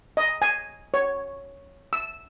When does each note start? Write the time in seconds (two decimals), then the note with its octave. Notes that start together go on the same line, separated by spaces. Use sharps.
0.17 D#5
0.42 G#5
0.94 C#5
1.93 E6